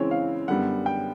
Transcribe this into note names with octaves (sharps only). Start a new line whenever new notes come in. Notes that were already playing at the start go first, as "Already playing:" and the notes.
Already playing: C#3 E3 G#3 C4 C#5
F5
F#2 D3 G3 B3 F#5
G5